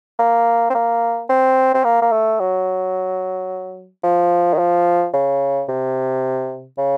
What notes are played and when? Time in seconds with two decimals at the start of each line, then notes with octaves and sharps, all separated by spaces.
0.19 A#3
0.70 C4
0.75 A#3
1.30 C4
1.74 C4
1.84 A#3
2.02 A#3
2.12 A3
2.40 F#3
4.04 F3
4.54 D#3
4.58 F3
5.14 C#3
5.69 C3
6.78 C#3